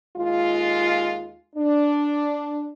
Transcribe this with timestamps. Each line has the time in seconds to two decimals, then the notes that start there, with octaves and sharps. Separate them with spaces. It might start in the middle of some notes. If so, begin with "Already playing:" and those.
0.16 D#2 G#3 F4
1.56 D4